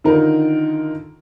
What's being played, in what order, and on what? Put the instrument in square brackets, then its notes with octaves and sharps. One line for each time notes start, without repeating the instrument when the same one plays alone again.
[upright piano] D3 D#3 D#4 F4 A#4